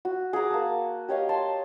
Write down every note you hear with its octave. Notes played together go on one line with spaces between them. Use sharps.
F#4
G#4 F#5 A#5 D6
A#3 A5
G4 C#5 D#5 F5
C#5 A5 C6